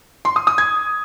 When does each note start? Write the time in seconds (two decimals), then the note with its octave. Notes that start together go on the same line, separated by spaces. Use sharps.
0.25 C6
0.36 D#6
0.47 D#6
0.58 G#6